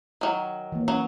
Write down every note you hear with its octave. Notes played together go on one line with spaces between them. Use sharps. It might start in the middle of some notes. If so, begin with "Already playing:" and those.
D#3 F#3
E3 A#3
F#3 C#4